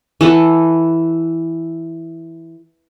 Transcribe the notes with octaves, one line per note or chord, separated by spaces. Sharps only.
E3 A4 F#5